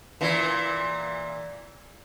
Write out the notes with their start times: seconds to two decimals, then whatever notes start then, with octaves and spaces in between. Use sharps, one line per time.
0.21 A#2 E3